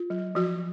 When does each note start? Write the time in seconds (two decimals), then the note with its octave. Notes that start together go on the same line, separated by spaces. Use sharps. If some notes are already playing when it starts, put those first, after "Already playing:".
Already playing: F4
0.10 F#3
0.35 F3 F#4